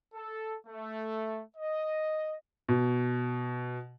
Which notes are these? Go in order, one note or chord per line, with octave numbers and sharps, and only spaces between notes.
A4
A3
D#5
B2